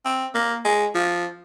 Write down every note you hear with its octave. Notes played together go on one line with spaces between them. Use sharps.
C4
A#3
G#3
F3